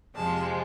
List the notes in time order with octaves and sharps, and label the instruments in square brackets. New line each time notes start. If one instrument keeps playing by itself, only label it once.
[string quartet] F2 C3 F3 G#3 A5